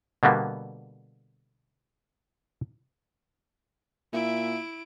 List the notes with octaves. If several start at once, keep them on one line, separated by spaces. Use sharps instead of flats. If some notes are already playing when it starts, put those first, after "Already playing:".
B2 D3 G3 A#3 B3
A#2 E4 E5 D7